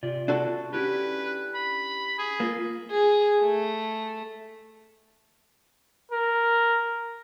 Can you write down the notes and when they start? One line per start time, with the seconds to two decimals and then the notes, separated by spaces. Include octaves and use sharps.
0.03 C3 F4 D5
0.28 D4 F#4 A4
0.73 C#4 E4 G4 B4
1.55 B5
2.18 G#4
2.40 A#3 F4 A4
2.91 G#4
3.42 A3
6.12 A#4